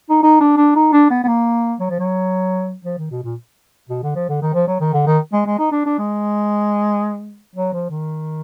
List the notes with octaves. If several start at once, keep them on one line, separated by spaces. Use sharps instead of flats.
D#4
D#4
D4
D4
D#4
D4
B3
B3
A#3
F#3
F3
F#3
F3
D#3
B2
A#2
B2
D3
F3
D3
D#3
F3
F#3
D#3
D3
D#3
G#3
G#3
D#4
D4
D4
G#3
F#3
F3
D#3